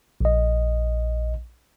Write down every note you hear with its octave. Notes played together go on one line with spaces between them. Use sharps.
A#1 D#5